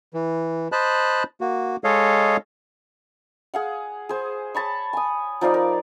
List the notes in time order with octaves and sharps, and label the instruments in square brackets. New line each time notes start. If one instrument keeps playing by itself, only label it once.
[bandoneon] E3
C5 D#5 A5 B5 F#6
A#3 F#4
G#3 A4 C#5 D#5 F5
[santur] G#4 F5 F#5
G#4 C5
C#5 A5 B5 C#6
G#5 D#6
F3 D#4 D5 F5
A#4